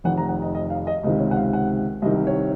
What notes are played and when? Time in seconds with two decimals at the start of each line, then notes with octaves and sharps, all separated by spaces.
0.04 F1 F2 D#3 F#5
0.18 A#5
0.29 F#5
0.42 D#5
0.55 D#5
0.70 F5
0.87 D#5
1.03 C#2 C3 D#3 D#5
1.19 C#5
1.31 F#5
1.36 F5
1.53 F#5
2.02 C2 C3 D#3 D#5
2.27 C#5